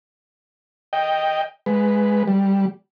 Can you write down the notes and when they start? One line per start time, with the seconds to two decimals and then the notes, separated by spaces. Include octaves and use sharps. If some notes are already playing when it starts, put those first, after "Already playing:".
0.93 D#5 G5
1.66 G#3 B4
2.28 G3